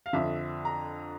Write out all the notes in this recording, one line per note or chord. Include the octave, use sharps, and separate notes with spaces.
F5
F2 D3 E5
A#5